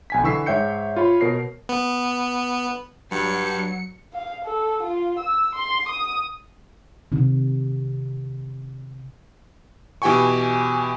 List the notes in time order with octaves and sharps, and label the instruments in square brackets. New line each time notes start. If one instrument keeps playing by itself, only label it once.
[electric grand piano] B1 G#5 B6
D3 E3 C#6 E6 B6 C7
G#2 C#5 E5 G5 G6 C#7
F4 C#5 B5
B2 A#4 C#5 C7
[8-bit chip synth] B3
[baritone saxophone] G2 [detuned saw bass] F#3 [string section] C#7
[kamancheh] F5
A4
F4
E6
C6
D#6
[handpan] C3 D#3
[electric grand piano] B2 E3 G4 G5 G#5 C#6